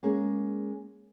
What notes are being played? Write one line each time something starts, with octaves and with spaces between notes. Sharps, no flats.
G#3 A#3 C#4 G#4